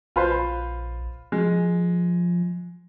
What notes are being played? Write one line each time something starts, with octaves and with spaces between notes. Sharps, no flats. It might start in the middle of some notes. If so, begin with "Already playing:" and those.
A#1 F4 B4 C5
F3 G#3